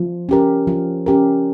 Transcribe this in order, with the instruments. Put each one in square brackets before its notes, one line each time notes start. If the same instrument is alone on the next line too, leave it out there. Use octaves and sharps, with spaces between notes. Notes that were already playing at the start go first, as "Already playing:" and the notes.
Already playing: [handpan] F3
C#4 G4 A#4
F3
C#4 G4 A#4